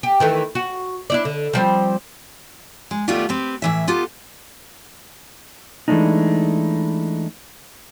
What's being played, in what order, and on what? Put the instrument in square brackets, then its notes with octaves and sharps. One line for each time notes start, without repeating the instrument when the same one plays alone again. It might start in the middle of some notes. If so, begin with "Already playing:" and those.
[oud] G4
D#3 E3 A3
F#4
D4 E4 D5
D3
F3 G3 C4
[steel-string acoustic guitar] G#3
D#2 G3 A3 B3 F4 G4
C4 G4 B4
A2 E3 E5
B3 F4 G4 A4
[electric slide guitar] E3 G#3 A3 B3 D4 D#4